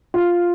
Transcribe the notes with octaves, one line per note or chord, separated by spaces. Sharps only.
F4